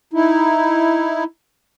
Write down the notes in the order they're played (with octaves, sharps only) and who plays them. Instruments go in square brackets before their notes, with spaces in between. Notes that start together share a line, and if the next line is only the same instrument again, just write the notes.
[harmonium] D#4 E4